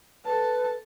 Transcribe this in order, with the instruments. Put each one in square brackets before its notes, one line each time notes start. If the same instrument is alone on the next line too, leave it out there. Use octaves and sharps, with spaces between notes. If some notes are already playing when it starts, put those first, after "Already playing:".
[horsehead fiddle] A4 A5 [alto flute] B4